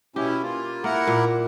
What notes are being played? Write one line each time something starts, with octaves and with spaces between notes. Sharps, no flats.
B2 C#4 E4 G4
A#3 F4
A#3 E4 A#4 F#5
A#2